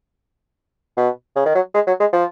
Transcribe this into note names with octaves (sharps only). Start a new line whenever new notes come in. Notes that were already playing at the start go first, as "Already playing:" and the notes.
B2
C#3
D#3
F#3
G#3
F#3
G#3
F3